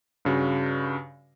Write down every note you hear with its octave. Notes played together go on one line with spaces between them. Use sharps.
G2 C#3 F#4